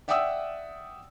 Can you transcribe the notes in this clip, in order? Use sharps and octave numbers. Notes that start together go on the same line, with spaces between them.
D5 E5 F#5 G5 D#6 E6